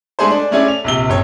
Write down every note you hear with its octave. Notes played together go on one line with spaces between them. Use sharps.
G#3 A3 D4 G#4 A4 C5
D4
A3 C#4 E4 G#4 D5 G#5
F7
A#1 C3 G7
F#1 C4 C#5